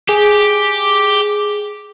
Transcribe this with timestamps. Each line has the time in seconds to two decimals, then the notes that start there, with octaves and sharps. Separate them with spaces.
0.09 G4 G#4